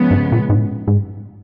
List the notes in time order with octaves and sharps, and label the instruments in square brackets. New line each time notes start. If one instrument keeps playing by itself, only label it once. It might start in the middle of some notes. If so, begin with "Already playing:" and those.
Already playing: [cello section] C#3 F3 G#3 B3
[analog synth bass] G2
A#2
G#2
A2
G#2